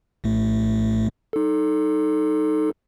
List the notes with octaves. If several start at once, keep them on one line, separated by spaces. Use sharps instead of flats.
A#1 A2 A3
D#4 A4